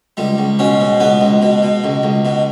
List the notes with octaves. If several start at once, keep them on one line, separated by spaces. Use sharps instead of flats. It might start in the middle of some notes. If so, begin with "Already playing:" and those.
C#2 G3
C#2
B2 C#4
B2
C#2 B3
C#2
B2
B2
C#2
C#2
B2